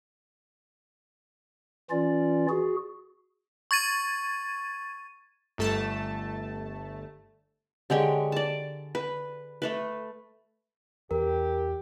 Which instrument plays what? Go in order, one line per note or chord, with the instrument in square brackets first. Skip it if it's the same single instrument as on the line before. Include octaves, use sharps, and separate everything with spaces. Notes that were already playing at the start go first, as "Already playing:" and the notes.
[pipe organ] E3 C#4 F4 D5
F#4 G#4
[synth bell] C#6 G#6 A6 D#7
[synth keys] G1 A3 A5
[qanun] D3 G#3 G4 C#5
D5 A5
B4
A3 A4 B4
[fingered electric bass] E2 [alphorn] G4 [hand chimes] A#4